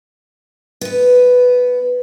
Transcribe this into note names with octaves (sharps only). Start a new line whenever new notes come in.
B3 B4